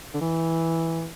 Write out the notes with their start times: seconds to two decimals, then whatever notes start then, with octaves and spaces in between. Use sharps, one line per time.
0.14 D3
0.21 E3